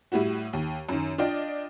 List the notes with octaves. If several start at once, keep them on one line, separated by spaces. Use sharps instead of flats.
A2 G3 E4 F#4
D#2
F#2 D#3
D4 F4 D5 D#5 G5